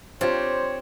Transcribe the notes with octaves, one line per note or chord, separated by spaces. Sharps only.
C4 D4 F4 G4 C5 C#5